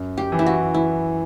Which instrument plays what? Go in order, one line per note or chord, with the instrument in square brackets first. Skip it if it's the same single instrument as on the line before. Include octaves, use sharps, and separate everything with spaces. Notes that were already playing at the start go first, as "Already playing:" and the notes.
Already playing: [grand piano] F#2
[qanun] G4
[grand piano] E3
[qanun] E4
F#4
[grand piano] E3 [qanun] E4